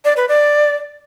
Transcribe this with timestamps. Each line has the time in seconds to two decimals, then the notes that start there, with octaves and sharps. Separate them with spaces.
0.05 D5
0.17 B4
0.29 D5